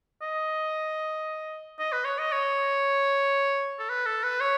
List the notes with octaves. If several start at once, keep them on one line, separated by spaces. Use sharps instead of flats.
D#5
D#5
B4
C#5
D#5
C#5
A4
B4
A4
B4
C#5